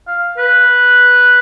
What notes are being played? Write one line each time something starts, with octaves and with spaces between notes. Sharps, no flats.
F5
B4